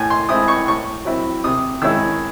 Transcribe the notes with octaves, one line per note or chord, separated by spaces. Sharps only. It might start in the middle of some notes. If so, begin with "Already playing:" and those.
Already playing: A2 G#5
C6
G#3 C4 E4 D#6
C#6
A2 C#6
F#3 C4 E4
C3 D#6
D#3 G#3 C#4 E4 E6